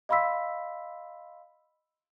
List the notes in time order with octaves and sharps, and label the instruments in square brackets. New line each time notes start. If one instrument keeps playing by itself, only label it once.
[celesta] D#5 F5 B5 C6 E6 B6